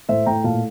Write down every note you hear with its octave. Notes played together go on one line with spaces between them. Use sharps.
A2 C5 E5
A2 G5 A#5
A#2 F5 A5